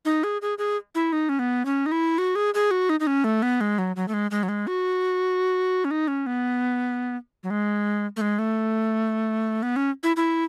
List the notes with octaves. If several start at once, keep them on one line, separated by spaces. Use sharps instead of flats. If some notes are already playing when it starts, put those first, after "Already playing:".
D#4
G#4
G#4
G#4
E4
D#4
C#4
B3
C#4
D#4
E4
F#4
G#4
G#4
F#4
D#4
D#4
C#4
A3
B3
G#3
F#3
F#3
A3
G#3
G#3
F#3
G#3
F#4
C#4
D#4
C#4
B3
F#3
G#3
A3
G#3
A3
B3
C#4
E4
E4